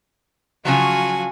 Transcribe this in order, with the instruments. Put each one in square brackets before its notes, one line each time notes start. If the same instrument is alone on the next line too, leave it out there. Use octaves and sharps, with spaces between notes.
[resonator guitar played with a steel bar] C#3 F3 F#3 [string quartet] F4 F#4 G#5